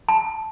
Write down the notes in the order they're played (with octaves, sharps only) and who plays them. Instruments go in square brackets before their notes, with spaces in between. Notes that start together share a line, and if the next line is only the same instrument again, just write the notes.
[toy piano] A5